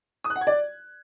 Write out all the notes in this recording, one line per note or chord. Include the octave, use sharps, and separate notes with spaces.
D#6
F#6
F#5
G#6
D5